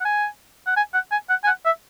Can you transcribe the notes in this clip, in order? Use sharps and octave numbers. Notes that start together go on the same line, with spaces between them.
F#5
G#5
F#5
G#5
F#5
G#5
F#5
G#5
F#5
E5